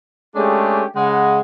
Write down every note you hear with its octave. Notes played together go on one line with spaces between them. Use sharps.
G#3 A3 C#4 D4 G4 G#4
C#3 G#3 F#5